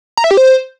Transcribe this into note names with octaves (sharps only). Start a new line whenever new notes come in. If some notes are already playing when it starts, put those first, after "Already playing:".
A#5
E5
G4
C5